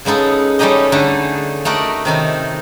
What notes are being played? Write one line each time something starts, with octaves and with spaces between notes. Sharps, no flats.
C#3 G#3 B3 D#4 A4
G3 A3 C#4 D#4 G4 D#5
D3 A3 D#4 G#4
A3 D#4 F#4 A#4 D5
C3 D#3 D#4 E4